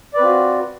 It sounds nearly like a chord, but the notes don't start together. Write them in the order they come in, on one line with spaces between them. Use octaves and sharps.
D5 B4 C4 F4 F#4